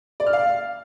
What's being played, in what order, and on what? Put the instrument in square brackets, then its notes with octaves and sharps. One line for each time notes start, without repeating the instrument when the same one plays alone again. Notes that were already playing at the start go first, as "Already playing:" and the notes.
[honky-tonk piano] D5
F6
F5